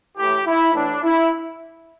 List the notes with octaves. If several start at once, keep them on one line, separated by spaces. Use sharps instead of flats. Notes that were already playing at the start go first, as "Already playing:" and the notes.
A2 E3 G4
E4
A2 E3 D4
E4